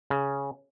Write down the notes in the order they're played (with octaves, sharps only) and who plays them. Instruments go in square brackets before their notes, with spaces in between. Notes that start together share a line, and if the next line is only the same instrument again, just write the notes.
[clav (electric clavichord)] C#3